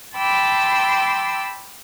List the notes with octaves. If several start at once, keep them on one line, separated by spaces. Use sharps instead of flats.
G5 A5 B5 C6 D6 E6